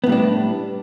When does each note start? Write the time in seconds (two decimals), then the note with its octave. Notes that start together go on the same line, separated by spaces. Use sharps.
0.04 B3
0.06 A2
0.09 G3
0.12 D4